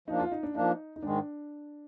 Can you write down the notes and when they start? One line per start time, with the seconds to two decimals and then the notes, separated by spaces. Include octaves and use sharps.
0.08 F3 A#3 D4 D#4
0.20 F4
0.32 D#4
0.43 D4
0.55 F3 A#3 D4 D#4
0.96 D#4
1.03 G#2 D#3 G#3 D4